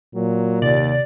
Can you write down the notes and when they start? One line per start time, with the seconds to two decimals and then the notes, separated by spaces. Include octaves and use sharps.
0.14 A#2 F#3
0.62 D#2 C3 D5